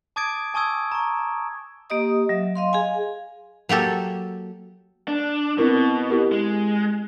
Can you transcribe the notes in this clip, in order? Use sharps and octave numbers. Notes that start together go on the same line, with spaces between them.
A5 D6 D#6 G#6 A6 D7
G#5 A5 C#6 D#6 E6 G#6
A#5 C#6
A#3 G4 D#5 D#6
F#3 E5
D#5 F5 C6
G#4 F5 G#5
F#3 A#3 G4 A4
D4
B2 C4 E4 A#4
E4 G4 A#4
G#3